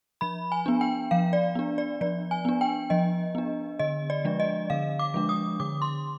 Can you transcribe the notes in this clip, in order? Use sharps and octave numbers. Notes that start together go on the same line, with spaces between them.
F3 B5
G#5
B3 D4
G5
F3 F5
D5
B3 D4
D5
F3 D5
G#5
B3 D4
G5
F3 D#5
B3 D4
D3 D#5
D5
F3 G#3 D4
D#5
D3 F5
D6
F3 G#3 D4
D#6
D3 D6
C6